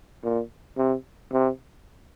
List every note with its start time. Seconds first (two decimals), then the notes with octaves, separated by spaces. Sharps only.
0.24 A#2
0.78 C3
1.32 C3